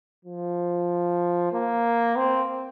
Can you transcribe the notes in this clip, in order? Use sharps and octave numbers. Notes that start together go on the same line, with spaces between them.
F3
A#3
C4